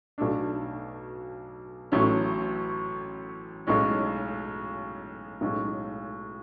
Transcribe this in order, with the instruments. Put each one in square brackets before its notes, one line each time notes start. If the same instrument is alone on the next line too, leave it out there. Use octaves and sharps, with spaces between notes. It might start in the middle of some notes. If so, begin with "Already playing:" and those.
[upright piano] B1 B2 A3 D4
A1 A2 F#3 A3 C#4
B1 A2 G#3 C#4
B1 A2 G#3 C#4